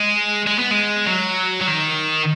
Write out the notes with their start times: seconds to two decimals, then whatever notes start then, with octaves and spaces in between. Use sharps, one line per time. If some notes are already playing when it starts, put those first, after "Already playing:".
Already playing: G#3
0.47 G#3
0.59 B3
0.71 G#3
1.07 F#3
1.61 F#3
1.67 D#3